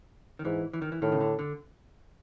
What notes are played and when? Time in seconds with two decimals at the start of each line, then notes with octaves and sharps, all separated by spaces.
0.39 D#3
0.45 G#2 E3
0.73 E3
0.82 D#3
0.92 E3
1.02 A2 D#3
1.12 C#3
1.21 D3
1.39 D3